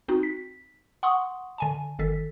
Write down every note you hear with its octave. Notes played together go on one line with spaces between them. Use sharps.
C4 D#4 F#4
B6
F#5 C6 C#6 D#6
D3 G#5 A5
G1 D#3 A4 B6